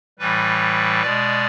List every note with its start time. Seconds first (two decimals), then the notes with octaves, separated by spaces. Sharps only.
0.19 A2 E3 G3 B4
1.02 B2 G#3 D5